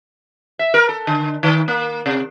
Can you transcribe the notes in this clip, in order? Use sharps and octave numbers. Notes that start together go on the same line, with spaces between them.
E5
A#4
A4
D3
D#3
A#3
C3